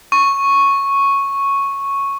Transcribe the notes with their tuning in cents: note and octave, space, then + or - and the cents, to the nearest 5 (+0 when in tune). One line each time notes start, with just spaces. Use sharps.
C#6 -5